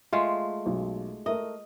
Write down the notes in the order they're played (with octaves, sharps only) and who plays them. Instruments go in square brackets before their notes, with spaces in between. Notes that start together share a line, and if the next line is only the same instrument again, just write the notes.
[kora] G#3 A3 F4
[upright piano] B1
[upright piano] A3 A#4 E5 [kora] D#5